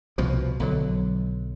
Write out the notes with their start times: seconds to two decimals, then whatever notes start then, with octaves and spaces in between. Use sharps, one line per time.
0.18 C2 B2 F3
0.60 B1 D3 F#3